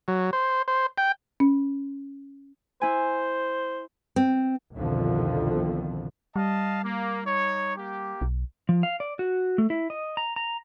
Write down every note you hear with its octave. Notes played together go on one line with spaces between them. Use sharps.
F#3
C5
C5
G5
C#4
E4 C5 G#5
C4
C2 F2 B2 D3 D#3 F3
G3 D#5 F5 A5
A#3
D#4 C#5
A#3 G4
B1
F3
F5
D5
F#4
A3
E4
D#5
A#5
A#5